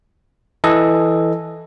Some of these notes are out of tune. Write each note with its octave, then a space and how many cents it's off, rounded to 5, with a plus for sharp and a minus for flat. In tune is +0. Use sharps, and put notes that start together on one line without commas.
E3 +0 A4 +0 D#5 +0